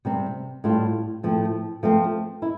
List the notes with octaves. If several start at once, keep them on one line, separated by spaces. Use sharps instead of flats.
C3 G3 C4
A2 G3 C4 F4
A2 F3 A3 C4
F3 A3 C4
E4